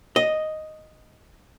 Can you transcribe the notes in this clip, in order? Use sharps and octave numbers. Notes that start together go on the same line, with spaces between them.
D#5